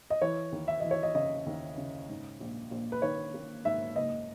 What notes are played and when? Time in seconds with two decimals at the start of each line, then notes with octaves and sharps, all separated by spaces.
0.10 D#5
0.22 E3 C#5
0.52 D#2
0.68 E5
0.80 E3 D#5
0.91 C#5
1.03 D#5
1.15 C#3 D#5
1.46 D#2
1.78 C#3
2.09 G#2
2.40 A#1
2.71 A#1
2.92 B4
3.02 D#3 C#5
3.34 A#3
3.65 G#2 E5
3.96 F#1 D#5